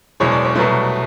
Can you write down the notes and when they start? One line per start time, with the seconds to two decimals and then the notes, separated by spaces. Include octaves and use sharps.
0.20 F#1 E2 B2 G#3 C#5
0.32 D5
0.44 C#5
0.55 C2 B2 F#3 A3 B4